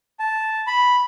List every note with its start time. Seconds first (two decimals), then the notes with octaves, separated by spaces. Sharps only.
0.19 A5
0.67 B5